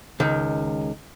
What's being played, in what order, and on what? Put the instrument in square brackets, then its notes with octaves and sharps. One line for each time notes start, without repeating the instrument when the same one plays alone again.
[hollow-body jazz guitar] C#2 D#3